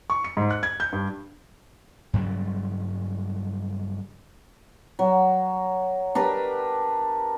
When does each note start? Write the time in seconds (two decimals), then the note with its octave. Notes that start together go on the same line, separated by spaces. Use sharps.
0.10 C#6
0.24 C#7
0.37 G#2
0.51 F#6
0.63 G#6
0.80 G6
0.93 G2
2.13 G2 C#3 F#3 G3
4.99 F#3
6.15 D4 G4 A#4 B4